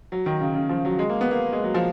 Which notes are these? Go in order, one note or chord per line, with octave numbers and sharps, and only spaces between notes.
F#3
D#3
C#3
C#3
F3
F#3
G#3
A#3
B3
A#3
G#3
F#3
F3